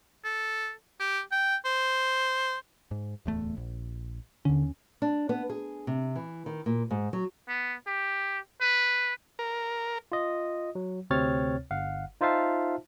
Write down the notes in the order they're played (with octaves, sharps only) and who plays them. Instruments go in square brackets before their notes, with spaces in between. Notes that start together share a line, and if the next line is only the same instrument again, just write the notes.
[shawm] A4
G4
G5
C5
[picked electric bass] G#2
D1 E2 A3
A#1
[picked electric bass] D#2 C#4 [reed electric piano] D3
[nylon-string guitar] D4
B3
G#4
C3
E3
D#3
A#2
G#2
F#3
[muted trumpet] B3
G4
B4
[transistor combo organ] A#4
[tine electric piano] F4 D#5
F#3
D2 C3 C4 C#5 F6 A6
G1 F5 F#5
D#4 F4 C5 E5 F5 A5